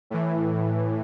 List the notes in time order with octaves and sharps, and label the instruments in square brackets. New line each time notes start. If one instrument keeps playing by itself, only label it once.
[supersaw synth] A2 E3